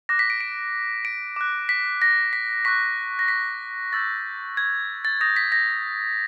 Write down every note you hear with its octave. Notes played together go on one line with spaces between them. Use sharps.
D6 F#6 A#6
B6
D7
D7
D7
D6 F#6
B6
A#6
B6
C#6 F#6 B6
A#6
B6
C#6 E6 G6 A6
G#6
A6
D#6 G6 A#6
B6
A#6